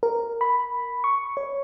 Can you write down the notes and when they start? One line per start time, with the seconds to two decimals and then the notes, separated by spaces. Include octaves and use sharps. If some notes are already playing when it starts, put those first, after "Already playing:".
0.03 A#4
0.41 B5
1.04 C#6
1.37 C#5